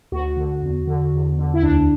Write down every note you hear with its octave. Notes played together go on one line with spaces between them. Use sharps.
D2 F#4
D3
E2
D3
E2
D3
E4
D2 D4